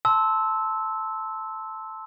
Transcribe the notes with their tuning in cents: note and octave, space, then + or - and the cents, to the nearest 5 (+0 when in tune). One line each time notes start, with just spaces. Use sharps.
A5 +0 C6 +0 E6 -15